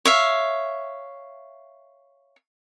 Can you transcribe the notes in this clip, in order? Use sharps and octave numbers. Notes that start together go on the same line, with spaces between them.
C#5 E5 F5